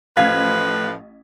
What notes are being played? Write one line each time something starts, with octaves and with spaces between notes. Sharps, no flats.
A1 A2 F3 B4 F5 G#6 B6